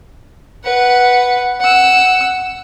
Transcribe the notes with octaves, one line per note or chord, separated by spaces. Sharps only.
B4 F#5
F#5 E6